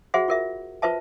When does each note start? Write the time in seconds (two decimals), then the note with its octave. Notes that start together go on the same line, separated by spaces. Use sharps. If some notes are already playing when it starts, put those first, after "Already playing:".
0.14 F#4 G#4 C5 E5 F#5
0.28 F4 A#4 E5
0.82 F4 B4 C5 E5 A5